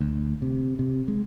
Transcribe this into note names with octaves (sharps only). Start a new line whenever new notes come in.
D2
C3
C3
G#3